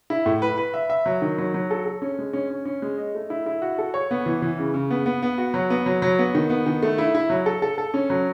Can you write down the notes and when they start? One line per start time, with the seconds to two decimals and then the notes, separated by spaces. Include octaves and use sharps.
0.10 E4
0.26 A2
0.42 B4
0.58 B4
0.74 E5
0.90 E5
1.06 F#3
1.22 D#3
1.38 F#3
1.54 F#3
1.71 A4
1.86 A4
2.02 C#4
2.19 G#3
2.33 C#4
2.50 C#4
2.65 C#4
2.82 G#3
2.98 D#5
3.15 A3
3.30 E4
3.46 E4
3.62 F#4
3.78 A4
3.94 C#5
4.11 B3
4.26 E3
4.42 E3
4.58 C#3
4.74 C#3
4.91 B3
5.06 B3
5.23 B3
5.38 F#4
5.54 F#3
5.70 B3
5.86 F#3
6.02 F#3
6.19 B3
6.35 D#3
6.50 B3
6.66 D#3
6.83 A3
6.98 E4
7.15 E4
7.30 F#3
7.46 A4
7.62 A4
7.78 A4
7.94 C#4
8.10 F#3